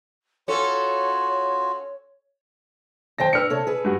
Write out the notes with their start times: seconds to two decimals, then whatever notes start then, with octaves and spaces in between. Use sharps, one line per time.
0.48 C#4 F4 F#4 A4 C#5
3.19 F#2 D#3 C5 G5 A5 A#6
3.33 D4 B4 E6 F6 C#7
3.50 C3 A4 C#5
3.67 G#4 B4
3.85 G2 F#4 F#5